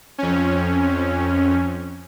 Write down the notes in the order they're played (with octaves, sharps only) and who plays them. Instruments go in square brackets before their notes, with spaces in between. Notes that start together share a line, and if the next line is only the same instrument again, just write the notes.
[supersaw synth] F2 C#4